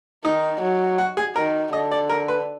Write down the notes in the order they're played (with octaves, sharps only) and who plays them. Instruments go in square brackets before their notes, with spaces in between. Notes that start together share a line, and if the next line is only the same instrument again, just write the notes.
[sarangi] D#3 [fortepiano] D#4
[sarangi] F#3
[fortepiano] F#4
G#4
[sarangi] D#3 [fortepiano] A#4
[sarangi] D3 [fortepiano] D#5
[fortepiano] D5
A#4
B4